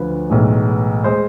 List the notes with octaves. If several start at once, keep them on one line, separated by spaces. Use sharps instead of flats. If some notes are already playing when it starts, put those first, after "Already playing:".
Already playing: D2 D3 F3 B4
B1 A2 E3 G#3
G#3 C5